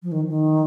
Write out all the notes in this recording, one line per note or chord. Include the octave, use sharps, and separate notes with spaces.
F3
D#3
D#3